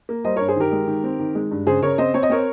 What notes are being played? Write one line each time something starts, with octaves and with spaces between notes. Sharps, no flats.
A#3
G3 C5 D#5
A#4 C#5
G2
G#4 C5
D#3 G4 A#4
G#3
D#3
C4
D#3
G#3
G2
C#3 G#4 C5
C#3 A#4 C#5
C4 C5 D#5
C4 C#5
D#5
C4 A#4 C#5